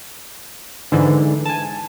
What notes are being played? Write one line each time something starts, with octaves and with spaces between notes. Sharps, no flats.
G#2 D3 E3
G#5 A5